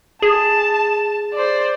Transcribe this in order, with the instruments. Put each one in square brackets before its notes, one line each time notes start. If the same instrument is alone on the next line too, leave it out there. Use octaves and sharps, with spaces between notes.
[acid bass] G#4 [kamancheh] A5
[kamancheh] C5 D5